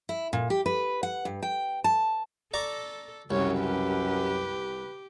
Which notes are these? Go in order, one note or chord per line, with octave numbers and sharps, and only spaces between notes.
E4
A#2
G4
B4
F#5
G2
G5
A5
A4 D5 A#5 C#6
C2 F#2 C#3 F#3 C#5
G4 B4